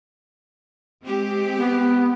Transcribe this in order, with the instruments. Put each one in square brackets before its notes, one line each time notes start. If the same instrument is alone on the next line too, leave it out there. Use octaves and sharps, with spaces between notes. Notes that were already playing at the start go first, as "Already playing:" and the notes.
[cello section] G#3 C4 G4
[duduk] B3